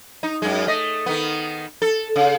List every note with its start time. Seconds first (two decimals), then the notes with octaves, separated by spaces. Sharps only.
0.23 D#4
0.42 F#2 G#3
0.67 A3 D#5
1.06 D#3 B3
1.82 A4
2.16 C#3